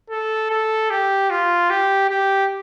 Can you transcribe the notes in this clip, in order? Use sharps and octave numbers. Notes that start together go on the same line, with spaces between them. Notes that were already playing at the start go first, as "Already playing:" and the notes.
A4
A4
G4
F4
G4
G4